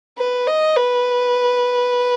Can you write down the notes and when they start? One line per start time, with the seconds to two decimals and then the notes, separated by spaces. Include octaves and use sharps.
0.17 B4
0.48 D#5
0.76 B4